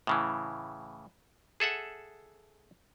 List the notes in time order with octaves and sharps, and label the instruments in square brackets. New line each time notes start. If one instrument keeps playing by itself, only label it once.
[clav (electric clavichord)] A2 C#3 E3
G#4 A4 E5 F#5